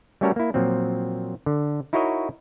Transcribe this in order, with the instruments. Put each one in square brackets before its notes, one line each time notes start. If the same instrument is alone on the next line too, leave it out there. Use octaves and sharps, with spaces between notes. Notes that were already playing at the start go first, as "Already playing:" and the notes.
[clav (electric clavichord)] G3 A3 C#4 F#4 A4 A#4
A#3 E4
A#2 F3 F#3 C4
D3
D#4 E4 F#4 A#4 C#5 D#5